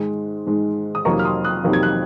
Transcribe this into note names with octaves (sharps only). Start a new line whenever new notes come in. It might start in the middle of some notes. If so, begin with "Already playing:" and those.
Already playing: G#2 D#3 G#3
G#2 D#3 G#3
D#6
F2 C3 D#3 F#3 A#3 A#5 C#6
F6
C6 D#6
D#6 F#6
F2 C3 D#3 F#3 A#3
G#6
F#6